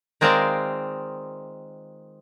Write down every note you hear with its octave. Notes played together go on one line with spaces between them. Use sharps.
D#3 G#3 C4 F4 A#4 D5